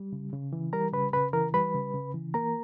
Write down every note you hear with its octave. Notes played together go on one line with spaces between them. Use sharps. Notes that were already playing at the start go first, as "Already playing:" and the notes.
Already playing: G3
C#3
C#3
E3
G3 A#4 A#5
C#3 B4 B5
C#3 B4 B5
E3 A#4 A#5
G3 B4 B5
C#3
C#3
E3
A#3 A#4 A#5